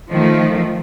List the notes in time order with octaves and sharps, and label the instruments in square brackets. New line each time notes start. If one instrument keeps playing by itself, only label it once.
[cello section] D#3 F3 A3